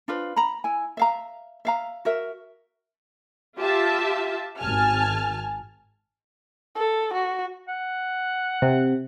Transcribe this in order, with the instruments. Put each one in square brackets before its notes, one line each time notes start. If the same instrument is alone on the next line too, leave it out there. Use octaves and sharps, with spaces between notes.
[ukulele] D4 F4 B4 C5
A#5 B5
E4 G#5
E5 F5 A#5
E5 F5 A#5
F#4 A#4 E5
[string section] F4 G4 E5 A5
G#1 G#5 A5 F6
[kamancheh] A4
F#4
[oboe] F#5
[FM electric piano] C3